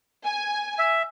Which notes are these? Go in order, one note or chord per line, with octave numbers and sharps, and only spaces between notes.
G#5
E5